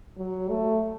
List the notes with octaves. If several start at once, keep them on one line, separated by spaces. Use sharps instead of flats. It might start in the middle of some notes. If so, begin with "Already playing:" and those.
F#3
A3